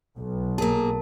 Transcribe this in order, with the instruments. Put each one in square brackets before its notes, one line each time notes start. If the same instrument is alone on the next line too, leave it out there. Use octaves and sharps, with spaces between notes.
[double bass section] B1
[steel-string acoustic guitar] A#3 G#4 [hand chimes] A#4 A5